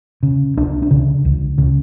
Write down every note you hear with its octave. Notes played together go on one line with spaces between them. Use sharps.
C#3
C#2 D4
D4
C#3
C#2
C#3